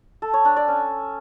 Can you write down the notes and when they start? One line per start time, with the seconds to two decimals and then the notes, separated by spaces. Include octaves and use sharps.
0.22 A4
0.34 C#5
0.45 D4
0.56 D5
0.68 C#4